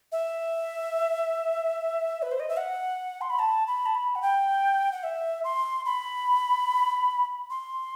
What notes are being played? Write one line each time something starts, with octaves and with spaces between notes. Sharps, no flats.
E5
B4
C5
D#5
E5
F#5
C6
B5
A5
B5
A5
B5
F#5
G5
F#5
E5
C6
B5
C6